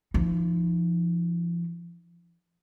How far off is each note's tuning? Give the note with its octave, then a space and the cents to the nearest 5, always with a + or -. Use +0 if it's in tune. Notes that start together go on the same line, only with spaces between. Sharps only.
F3 -30 D#4 -5